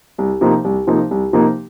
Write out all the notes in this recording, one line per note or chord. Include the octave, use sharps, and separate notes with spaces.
C2
C3 F3 A#3 D#4
C2
C3 F3 A#3 D#4
C2
C3 F3 A#3 D#4